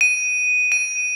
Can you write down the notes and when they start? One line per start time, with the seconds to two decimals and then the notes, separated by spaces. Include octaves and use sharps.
0.01 D#7
0.72 D#7